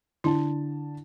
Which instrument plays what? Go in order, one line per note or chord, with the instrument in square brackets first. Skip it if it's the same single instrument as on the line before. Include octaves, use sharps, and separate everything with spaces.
[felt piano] D3 D4 A5 [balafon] E4